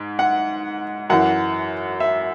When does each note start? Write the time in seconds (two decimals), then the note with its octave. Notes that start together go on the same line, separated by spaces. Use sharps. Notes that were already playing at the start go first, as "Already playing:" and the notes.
Already playing: G#2
0.19 F#5
1.10 F#2 E3 F#5
2.00 E5